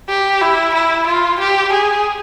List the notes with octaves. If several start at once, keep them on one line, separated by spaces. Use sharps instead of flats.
G4
E4
E4
F4
G4
G#4